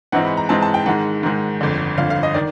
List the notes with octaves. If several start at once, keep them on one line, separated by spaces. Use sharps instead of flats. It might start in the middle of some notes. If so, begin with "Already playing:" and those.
G#2 E3 G#3 C4 D#4 F#5
B5
A#5
G#2 E3 G#3 C4 D#4 A5
A5
G5
G#2 D#3 G#3 F#5
G#2 D#3 G#3
G1 F2 D3
G1 F2 D3 F5
F5
D#5
D#3 D5